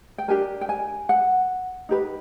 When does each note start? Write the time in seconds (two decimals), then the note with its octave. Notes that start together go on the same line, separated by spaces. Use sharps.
0.18 G5
0.28 D4 G4 A#4 G#5
0.61 G5
0.69 G#5
1.09 F#5
1.89 D#4 G4 B4